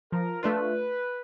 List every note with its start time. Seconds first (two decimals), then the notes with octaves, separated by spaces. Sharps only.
0.12 F3 A#4
0.43 A3 D4 F4 B4